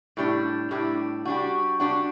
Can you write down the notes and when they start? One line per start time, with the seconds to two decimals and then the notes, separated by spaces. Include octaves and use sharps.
0.17 A2 G3 D4
0.71 A2 G3 D4
1.25 G3 D4 F#4
1.80 G3 D4 F#4